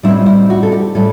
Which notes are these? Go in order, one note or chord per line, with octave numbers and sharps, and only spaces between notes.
A2 G3 C4 D#4 E4
E4
F#4
A4
G4
A2 G3 A4